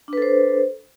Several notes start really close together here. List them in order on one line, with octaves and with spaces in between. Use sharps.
D4 B4 A4 C5